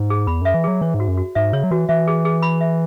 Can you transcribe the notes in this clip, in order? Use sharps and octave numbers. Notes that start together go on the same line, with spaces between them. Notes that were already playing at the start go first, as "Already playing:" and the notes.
Already playing: G#2
G#4
E2 B5
F#2 E5
E3
F#3 G#4
E3 C#5
G#2
F#4
F#2
F#4
G#2 E5
C#3 C#5
F#3
E3 F#4
E3 E5
G#4
G#4
B5
E5